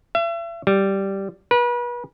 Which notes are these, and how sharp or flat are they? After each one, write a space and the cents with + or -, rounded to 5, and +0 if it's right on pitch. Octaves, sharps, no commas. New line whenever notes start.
E5 +40
G3 -5
B4 -35